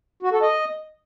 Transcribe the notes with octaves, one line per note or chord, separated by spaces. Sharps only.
F#4
A4
D#5